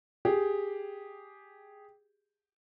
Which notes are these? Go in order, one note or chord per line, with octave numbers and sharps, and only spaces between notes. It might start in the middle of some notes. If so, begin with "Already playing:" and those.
G4 G#4